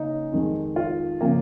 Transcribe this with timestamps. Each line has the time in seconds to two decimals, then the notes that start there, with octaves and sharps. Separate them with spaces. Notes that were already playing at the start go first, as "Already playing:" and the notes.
Already playing: C#3 A#3 D#4
0.32 F2 D#3 G#3
0.76 F4
1.21 C#3 F3 A#3